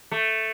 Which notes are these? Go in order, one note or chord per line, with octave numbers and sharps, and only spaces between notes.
A3